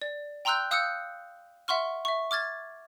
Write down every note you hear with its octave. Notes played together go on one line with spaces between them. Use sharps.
D5
G5 A#5 C6 E6 F#6 G6
F5 D#6 E6 F#6 G6 C#7
E5 F#5 C6 C#6 F6
E5 C#6
D6 F6 G#6 A6